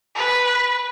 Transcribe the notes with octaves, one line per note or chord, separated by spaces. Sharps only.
B4